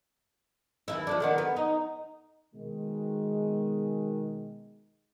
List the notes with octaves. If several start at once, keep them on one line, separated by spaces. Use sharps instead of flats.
D#2 E3 E4
F3 A3 D4
D3 D#3 B3
B3
D#4
B2 D#3 G#3